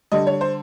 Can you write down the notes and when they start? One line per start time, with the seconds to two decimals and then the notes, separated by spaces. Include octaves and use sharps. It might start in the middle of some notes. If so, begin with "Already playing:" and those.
0.12 D3 G3 D#5
0.27 C#5
0.41 C5